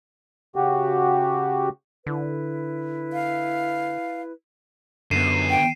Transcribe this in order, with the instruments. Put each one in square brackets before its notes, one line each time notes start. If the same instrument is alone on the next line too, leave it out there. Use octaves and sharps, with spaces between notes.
[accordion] C#3 F#4 G4
[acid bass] D3 [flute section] E4 B4
[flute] F5
[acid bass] F#2 [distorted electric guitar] D3 B3 [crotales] C7 D#7 E7
[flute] G5